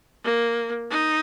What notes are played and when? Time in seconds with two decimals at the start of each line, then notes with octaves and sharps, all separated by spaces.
0.24 A#3
0.91 D#4